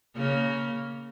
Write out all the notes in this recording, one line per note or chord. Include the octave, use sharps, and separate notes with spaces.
C#3 A#3